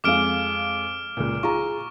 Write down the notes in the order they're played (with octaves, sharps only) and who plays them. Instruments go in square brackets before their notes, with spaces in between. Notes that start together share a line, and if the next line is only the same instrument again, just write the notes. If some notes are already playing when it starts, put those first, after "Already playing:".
[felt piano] F2 G#3 F5 [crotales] D6 F6 D7
[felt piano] C#2 A#2
[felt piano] F4 G#4 A#5 [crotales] C#6